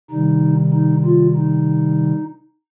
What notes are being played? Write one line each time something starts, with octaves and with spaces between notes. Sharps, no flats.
C3 D#3 G3 D#4
D#4
F4
D#4